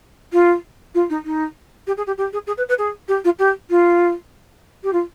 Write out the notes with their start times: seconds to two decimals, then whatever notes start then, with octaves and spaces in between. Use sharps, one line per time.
0.33 F4
0.95 F4
1.10 D#4
1.25 D#4
1.87 G4
1.97 G#4
2.07 G4
2.18 G4
2.33 G#4
2.47 G#4
2.58 B4
2.69 B4
2.78 G#4
3.08 G4
3.25 F4
3.39 G4
3.70 F4
4.84 G4
4.93 F4